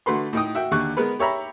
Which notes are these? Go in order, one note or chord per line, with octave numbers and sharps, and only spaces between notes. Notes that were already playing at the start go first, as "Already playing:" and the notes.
D3 A3 F#4 B4 C6
A2 D#4 G5 D#6
F#4 E5 G5
D#2 D3 G4 C#6 F#6
G#3 B3 A#4 B4
G4 C#5 E5 A#5 B5